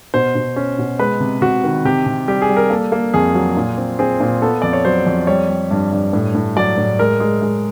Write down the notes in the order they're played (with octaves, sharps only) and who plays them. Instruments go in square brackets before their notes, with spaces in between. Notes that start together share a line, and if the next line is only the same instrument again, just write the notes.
[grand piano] B2 C5
B2
C#4
B2
G#3 B4
C3
C3 F#4
D#3
C3 G4
C3
G3 G4
G#4
G3
A#4
A#3 A4
A#3
F2 G#4
F#3
A#2
C4
C4 G#4
A#2
B3 A4
F2 D5
C#5
F#3 C5
F2
G3 C#5
G3
G2
G2
A2
A2
F#3 D5
A2
G#3 A#4
G#3
G#3